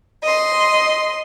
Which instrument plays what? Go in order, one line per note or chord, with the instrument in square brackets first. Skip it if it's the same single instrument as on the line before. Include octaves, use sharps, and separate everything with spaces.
[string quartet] D#5 C6